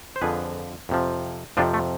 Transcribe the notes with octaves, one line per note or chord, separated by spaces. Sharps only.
C5
F2 D3 F3 G#4 B4
F2 C3 F3
F2 C3 F3 D4 F4
A3